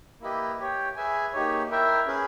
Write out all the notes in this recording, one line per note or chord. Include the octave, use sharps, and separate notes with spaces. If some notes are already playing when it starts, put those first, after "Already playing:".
A#3 E4 G4 B4 D#5
G4 C#5 G5
G#4 B4 E5 G#5
A#3 D#4 G4 C#5
E4 A#4 E5 G5
C#4 G#4 B4